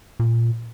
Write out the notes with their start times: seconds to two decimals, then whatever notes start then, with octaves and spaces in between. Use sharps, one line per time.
0.20 A#2